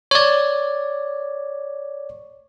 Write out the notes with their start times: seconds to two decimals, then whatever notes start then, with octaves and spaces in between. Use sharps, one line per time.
0.11 C#5 D5